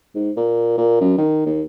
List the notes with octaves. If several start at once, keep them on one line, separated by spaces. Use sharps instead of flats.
G#2
A#2
A#2
F#2
D#3
D#2